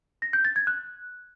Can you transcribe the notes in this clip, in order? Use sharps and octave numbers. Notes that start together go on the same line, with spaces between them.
A#6
G6
A6
G#6
F#6